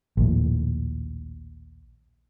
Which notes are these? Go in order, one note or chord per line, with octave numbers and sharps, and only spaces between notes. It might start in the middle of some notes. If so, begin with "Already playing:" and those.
A#1 D#2 A2